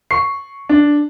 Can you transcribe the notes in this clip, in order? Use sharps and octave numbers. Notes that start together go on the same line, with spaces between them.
C#6 C7
D4